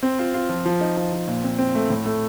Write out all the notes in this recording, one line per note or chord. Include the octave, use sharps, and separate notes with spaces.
C4
F4
F4
F3
F3
D#4
F3
F3
A#2
C4
C4
A3
A2
A3